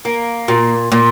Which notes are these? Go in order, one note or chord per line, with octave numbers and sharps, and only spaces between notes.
A#3
A#2
A#2